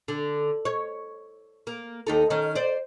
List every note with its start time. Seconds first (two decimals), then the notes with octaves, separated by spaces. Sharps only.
0.08 D3
0.65 C#5
1.67 A#3
2.07 D#2 D#4 A4
2.30 D#3 C#4
2.55 C5 D5